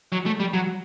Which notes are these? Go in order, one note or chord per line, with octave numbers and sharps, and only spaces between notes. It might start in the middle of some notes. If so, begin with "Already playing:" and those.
F#3
A3
G3
F#3